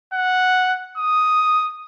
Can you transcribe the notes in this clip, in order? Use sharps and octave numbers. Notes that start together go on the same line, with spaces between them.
F#5
D#6